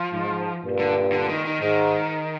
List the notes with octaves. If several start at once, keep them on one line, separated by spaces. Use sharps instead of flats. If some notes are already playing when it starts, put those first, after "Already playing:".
Already playing: F3
G#2
G2 A#2
D3
D3
D#3
D#3
G#2 D#3